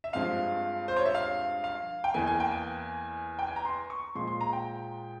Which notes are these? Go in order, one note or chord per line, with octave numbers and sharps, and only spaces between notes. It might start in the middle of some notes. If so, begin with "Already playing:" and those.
E5
G2 F3 G#3 C4 F5
C5
C#5
E5
F5
F5
G5
E2 E3 A#3 G#5
G#5
G5
G#5
G5
G#5
A#5
C6
C#6
A#2 F3 G#3 C6
C6
A#5
G5